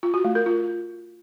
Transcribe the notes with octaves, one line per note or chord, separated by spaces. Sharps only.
F4
F#4
A3
A#4
F4